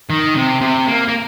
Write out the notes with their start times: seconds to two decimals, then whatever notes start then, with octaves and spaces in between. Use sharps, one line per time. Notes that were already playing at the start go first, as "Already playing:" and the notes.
0.10 D#3
0.35 C3
0.61 C3
0.88 A#3
1.08 A#3